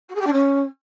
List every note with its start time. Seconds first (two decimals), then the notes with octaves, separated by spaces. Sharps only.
0.09 F#4
0.14 G#4
0.20 G4
0.26 D4
0.32 C#4